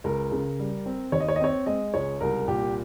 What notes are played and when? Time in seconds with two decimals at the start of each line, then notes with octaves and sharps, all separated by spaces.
0.04 C#2 A#4
0.32 C#3
0.59 G3
0.86 C4
1.12 D#2 C#5
1.20 D#5
1.28 C#5
1.36 D#5
1.40 C4 C#5
1.66 G#3 D#5
1.94 C#2 C#5
2.20 C2 A#4
2.48 A#2 G4